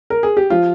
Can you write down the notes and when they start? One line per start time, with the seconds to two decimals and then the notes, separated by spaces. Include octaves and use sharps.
0.10 A#4
0.23 G#4
0.37 G4
0.50 F3 F4